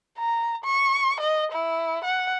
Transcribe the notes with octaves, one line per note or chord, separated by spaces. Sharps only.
A#5
C#6
D#5
E4
F#5